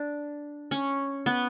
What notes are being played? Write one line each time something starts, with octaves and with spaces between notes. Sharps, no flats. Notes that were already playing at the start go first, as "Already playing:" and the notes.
Already playing: D4
C#4
B3